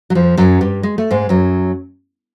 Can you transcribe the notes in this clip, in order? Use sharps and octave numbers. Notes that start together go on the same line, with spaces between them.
F#3
F2 F3
F#2 F#3
G2 G3
G#3
A3
G#2 G#3
F#2 F#3